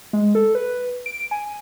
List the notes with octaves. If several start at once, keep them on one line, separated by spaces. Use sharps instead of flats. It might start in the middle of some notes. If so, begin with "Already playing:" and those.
G#3
A4
B4
D7
G#5